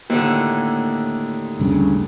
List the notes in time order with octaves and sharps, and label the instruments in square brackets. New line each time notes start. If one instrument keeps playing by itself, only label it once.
[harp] D#2 A2 D3
[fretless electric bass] D2 G2 C#3